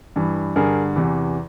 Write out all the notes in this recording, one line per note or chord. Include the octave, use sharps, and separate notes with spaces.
G2 E3
G2 D3 G#4 A#4
E2 C3 E3